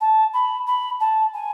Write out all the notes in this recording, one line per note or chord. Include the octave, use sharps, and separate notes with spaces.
A5
B5
B5
A5
G#5